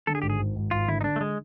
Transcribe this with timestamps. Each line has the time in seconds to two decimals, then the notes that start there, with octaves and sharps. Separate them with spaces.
0.07 D3 A4
0.15 G#4
0.22 G#1 G4
0.30 G#4
0.39 G#1
0.56 G#1
0.71 G#1 F4
0.88 D3 E4
1.01 D#4
1.04 D3 D4
1.16 A3
1.21 G#3